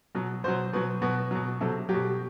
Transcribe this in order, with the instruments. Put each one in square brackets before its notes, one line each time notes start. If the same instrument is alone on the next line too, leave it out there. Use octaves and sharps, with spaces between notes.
[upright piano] B2 F#3
B2 F#3 C5
B2 F#3 B4
B2 F#3 B4
B2 F#3
C3 F#3 A4
F#3 G4
B2